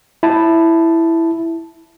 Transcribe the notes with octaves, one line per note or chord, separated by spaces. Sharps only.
E4 A5